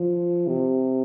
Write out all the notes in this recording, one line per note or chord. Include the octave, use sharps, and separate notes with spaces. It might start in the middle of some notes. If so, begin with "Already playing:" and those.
Already playing: F3
C3